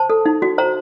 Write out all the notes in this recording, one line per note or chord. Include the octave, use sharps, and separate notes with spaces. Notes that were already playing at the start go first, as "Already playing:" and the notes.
Already playing: C5 A5
A4
D#4
F#4
C5 A#5